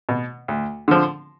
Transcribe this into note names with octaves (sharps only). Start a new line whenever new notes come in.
B2
D2
D3 F3